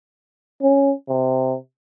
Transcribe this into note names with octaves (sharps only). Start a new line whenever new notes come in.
C#4
C3